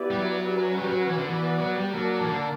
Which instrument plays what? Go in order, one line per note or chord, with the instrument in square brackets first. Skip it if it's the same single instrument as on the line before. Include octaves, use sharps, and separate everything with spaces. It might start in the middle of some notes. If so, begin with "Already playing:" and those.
Already playing: [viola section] B3 E4 G4 B4 D5
[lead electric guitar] G3
F#3
[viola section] C#4 F#4 B4
[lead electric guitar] G3
F#3
E3
D3
[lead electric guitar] E3 [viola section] B3 F#4 B4 D5
[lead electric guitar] F#3
G3
[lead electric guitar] F#3 [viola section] A#3 D4 A#4 D5
[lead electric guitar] E3
D3